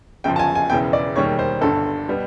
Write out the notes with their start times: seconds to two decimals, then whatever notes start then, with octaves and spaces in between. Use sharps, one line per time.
0.24 G1 F#2 C#3 F3 G5
0.36 A5
0.39 G#5
0.55 G#5
0.70 E1 E2 C#3 E3 G5
0.93 D5
1.16 E1 D#2 D#3 G3 C#5
1.39 C5
1.61 G1 G2 D3 A4
2.08 B2 G3 B3